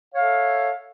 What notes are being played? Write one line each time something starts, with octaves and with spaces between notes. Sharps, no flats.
A4 C#5 E5 F5